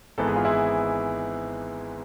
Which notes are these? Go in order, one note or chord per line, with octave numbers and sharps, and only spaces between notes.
G#1 G#2 E3 B3 A4
G#4
F4
E4 G#4